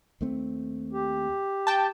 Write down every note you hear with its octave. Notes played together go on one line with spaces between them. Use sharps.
D#2 A3 C4
G4
G5 A5